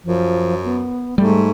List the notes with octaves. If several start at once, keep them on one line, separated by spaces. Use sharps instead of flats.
F#2 F3
B3
G#2 G3 A3